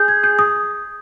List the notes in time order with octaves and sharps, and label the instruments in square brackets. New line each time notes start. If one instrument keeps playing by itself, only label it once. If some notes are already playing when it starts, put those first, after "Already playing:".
Already playing: [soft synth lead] G#4 [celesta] G6
[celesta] G#6
G6
D#6